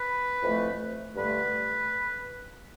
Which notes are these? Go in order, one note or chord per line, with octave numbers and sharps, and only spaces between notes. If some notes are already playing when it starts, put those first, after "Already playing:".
Already playing: B4
F2 E3 A3
G2 D3 A3 B4